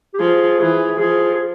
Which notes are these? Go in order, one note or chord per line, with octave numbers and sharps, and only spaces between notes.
G4
F3 G#4
E3 G#4
F3 G#4
G#4